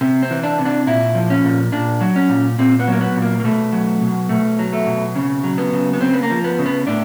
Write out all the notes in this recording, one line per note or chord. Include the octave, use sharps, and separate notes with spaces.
C3
C4
E3
D4
C3
D4
A#2 E4
F3
C#4
A#2
A#2 D4
F#3
C#4
A#2
A#2 C4
B3
F#3 A#3
B3
A#2
A#3
A#3
B2 A3
F#3
B2
B2 A3
F#3
A3
B2
C#3
F#3
B3
C#3
B3
C#3 C4
B3
A#3
F3
B3
C#3
B3
A2 D4